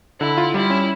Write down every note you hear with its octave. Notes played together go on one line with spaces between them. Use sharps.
D3 E4
F4
G3 E4
C#4